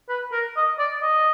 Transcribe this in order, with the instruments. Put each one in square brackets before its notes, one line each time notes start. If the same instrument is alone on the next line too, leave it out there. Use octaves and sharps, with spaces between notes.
[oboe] B4
A#4
D#5
D5
D#5